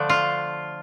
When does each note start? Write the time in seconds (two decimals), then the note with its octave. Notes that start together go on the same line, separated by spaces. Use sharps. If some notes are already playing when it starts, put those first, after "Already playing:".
Already playing: D3 F3 A3 D4
0.09 F4